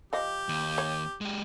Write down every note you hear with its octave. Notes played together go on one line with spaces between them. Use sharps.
F3 G4 D#5
D#2
C#5
G#3 G4